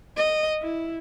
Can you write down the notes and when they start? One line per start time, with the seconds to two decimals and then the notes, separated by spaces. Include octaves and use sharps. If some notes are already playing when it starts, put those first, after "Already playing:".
0.17 D#5
0.62 E4